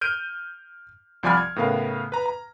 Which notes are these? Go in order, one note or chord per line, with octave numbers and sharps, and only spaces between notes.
F6 G6 D7 D#7
C2 F3 D5 G#5 B5 F6
G#6
A2 C#3 B3 A#4 F5
B4 A#5
A#5